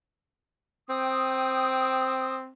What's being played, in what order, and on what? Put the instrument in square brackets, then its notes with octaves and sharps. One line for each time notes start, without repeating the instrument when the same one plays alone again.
[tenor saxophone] C4 [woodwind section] G5 D#6